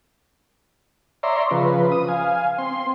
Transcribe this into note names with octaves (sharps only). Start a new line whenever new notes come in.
C#5 D5 E5 A#5 C6
C#3 F3 B4
D#6
F5 G#5
C4 C6